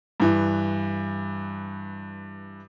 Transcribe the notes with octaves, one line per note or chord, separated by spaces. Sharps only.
G2 E3